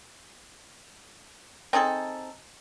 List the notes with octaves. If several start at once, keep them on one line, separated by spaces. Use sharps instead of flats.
C4 D#4 G#4 A4